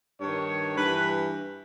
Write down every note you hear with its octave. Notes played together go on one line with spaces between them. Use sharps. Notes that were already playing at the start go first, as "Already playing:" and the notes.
G2 D#3 C#5
G2 E3 B4